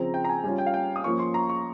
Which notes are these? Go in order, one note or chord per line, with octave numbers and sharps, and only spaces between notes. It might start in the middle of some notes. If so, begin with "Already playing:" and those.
Already playing: C#3 F3 C4 A#5
G5
A#5
G#5
G3 C#4 F4 G#5
G5
F5
G5
D#6
F3 A#3 C#4 C#6
C6
A#5
C#6